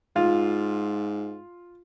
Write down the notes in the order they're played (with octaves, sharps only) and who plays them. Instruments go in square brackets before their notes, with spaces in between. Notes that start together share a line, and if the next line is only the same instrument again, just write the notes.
[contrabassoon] G#2 [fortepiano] F4